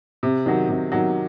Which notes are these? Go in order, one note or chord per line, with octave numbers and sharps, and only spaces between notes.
C3
D#3 F#3
C3
D#3 F#3